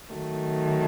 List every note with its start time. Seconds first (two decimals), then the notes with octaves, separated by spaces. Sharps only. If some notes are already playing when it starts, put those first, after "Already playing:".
0.12 D#3 F#3 A3